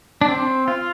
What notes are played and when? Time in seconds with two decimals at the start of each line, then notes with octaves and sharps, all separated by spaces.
0.21 D4
0.28 C4
0.68 F4